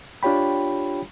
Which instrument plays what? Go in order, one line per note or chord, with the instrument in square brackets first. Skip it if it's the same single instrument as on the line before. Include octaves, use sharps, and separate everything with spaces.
[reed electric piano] D4 F4 G4 C#5 G5 B5